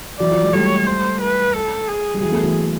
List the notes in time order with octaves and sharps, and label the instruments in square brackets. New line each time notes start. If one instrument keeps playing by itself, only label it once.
[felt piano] E3 F#3 [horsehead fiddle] D5
[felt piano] F3
F#3 G#3
[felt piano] G3 A3 [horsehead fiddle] C#5
[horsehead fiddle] C5
B4
A4
G#4
[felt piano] G3
[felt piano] E3 F#3 [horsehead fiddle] G#4
[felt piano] A3 B3
E3 F#3